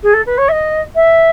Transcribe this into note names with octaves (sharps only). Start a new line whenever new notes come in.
G#4
A4
B4
C#5
E5
D#5
E5